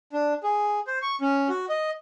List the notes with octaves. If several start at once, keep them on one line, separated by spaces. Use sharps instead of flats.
D4
G#4
C5
C#6
C#4
F#4
D#5